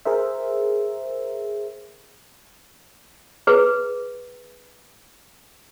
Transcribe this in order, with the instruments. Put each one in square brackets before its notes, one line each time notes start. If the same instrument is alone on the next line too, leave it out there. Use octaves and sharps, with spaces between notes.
[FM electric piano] G#4 A#4 C5 E5
[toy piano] G#4 B4